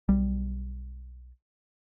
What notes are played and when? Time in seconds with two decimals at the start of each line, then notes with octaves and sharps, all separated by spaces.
0.09 B1 G3